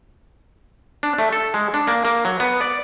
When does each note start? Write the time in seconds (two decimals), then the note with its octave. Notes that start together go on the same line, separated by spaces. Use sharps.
1.03 D4
1.18 A3
1.33 A4
1.54 G#3
1.74 D4
1.87 A#3
2.05 A#3
2.25 F#3
2.40 B3
2.61 D5